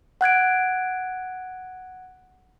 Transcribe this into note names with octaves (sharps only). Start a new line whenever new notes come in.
F#5 F#6 G#6 D7